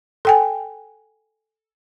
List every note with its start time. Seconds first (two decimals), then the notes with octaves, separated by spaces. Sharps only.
0.25 A4 G5 G#5